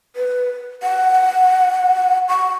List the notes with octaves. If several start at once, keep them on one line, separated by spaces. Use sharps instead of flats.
B4
F#5
C#6